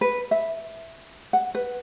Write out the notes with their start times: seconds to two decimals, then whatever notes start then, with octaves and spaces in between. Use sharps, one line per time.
0.01 B4
0.31 E5
1.33 F#5
1.55 B4